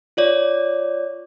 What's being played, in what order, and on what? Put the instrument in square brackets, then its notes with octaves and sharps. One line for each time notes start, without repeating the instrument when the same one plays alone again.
[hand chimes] F4 C#5 D5